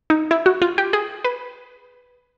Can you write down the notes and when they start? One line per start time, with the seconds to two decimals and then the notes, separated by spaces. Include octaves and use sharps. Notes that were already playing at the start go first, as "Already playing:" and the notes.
0.10 D#4
0.31 E4
0.46 F#4
0.62 F4
0.78 G4
0.93 G#4
1.24 B4